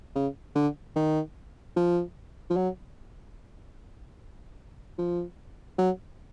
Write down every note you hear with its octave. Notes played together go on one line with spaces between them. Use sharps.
C#3
D3
D#3
F3
F3
F#3
F3
F#3